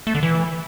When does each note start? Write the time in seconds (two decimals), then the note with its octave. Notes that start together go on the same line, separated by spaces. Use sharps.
0.07 A3
0.15 D3
0.23 E3